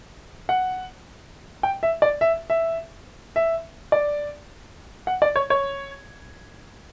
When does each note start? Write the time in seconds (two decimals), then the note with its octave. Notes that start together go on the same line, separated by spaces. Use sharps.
0.49 F#5
1.63 G5
1.83 E5
2.02 D5
2.21 E5
2.50 E5
3.36 E5
3.92 D5
5.07 F#5
5.22 D5
5.36 C#5
5.50 C#5